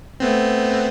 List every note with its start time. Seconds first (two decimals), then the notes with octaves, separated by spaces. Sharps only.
0.20 A3 B3 C4